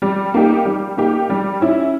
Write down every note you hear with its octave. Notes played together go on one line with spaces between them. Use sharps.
G3
A#3 D#4 G4
G3
A#3 D#4 G4
G3
C#4 E4